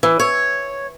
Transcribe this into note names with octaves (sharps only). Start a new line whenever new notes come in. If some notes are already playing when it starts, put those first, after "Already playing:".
E3
C#5